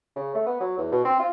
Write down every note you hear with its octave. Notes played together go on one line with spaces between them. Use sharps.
C#3
A3
B3
F#3
E2
B2
C4
F4